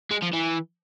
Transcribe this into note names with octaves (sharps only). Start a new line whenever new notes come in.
G#3
F3
E3